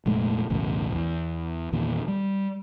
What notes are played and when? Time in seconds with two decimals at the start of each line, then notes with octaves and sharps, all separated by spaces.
0.06 F1 A#2 G#3 A3
0.50 B1 E2 A2 C#3
0.93 E2
1.72 E2 A#2 D#3
2.08 G3